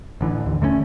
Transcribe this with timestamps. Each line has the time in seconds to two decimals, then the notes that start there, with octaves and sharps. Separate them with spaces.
0.21 A1 D3 E3
0.46 D#2
0.62 D3 A3 A#3 C#4